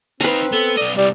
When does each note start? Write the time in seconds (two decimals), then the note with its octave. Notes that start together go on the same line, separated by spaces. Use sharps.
0.21 C4 D#4 B4 F5 A#5
0.53 B3 A4
0.77 B1 D5 D#5
0.97 C2 G3 D5